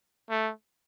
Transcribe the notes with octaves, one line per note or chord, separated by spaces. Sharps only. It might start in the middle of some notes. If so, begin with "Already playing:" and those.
A3